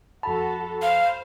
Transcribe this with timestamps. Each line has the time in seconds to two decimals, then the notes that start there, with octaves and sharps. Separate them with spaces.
0.23 F2 F#4 A4 A5 B5
0.82 C5 F5